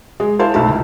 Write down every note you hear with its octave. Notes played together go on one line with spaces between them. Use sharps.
G#3 G#4
E4 C5 F5 A5 C6
B1 A2 A3 A5
C#2